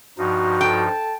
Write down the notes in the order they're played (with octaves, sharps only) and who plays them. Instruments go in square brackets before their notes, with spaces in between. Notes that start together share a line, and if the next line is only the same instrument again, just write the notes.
[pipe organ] G2 F3 D#4 [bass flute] F#4
[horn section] A4 A5 [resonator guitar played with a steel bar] G5